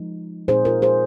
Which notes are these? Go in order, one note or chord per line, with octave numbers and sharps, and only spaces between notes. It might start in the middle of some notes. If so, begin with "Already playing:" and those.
Already playing: F3 G#3 D#4
A#2 G#3 C4 D#4 G#4 C5
F4 A#4
G#4 C5